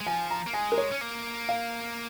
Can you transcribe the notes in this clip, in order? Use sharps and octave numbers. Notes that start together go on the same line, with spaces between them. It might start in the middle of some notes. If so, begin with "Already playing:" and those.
G#3
F3 G#5
A#5
A#3
G#3 G#5
A#4
C#5
C#4
A#3
F5